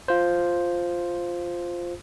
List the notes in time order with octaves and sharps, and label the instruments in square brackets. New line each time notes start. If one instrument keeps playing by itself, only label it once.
[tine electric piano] F4 C5